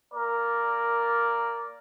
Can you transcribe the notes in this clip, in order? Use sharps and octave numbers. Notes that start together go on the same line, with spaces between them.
A#3 A#4 D5